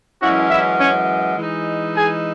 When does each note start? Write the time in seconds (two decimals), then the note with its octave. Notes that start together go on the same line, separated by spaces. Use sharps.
0.21 F#2 E3 G#3 C#4 E4 F#4 F#5
0.51 E4 E5
0.80 C#4 C#5
1.38 E3 G#3 D#4
1.97 G#4 G#5